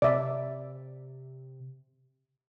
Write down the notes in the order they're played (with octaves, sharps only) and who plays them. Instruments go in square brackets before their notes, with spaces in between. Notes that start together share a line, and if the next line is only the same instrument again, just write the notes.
[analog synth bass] C3 [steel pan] D5 E5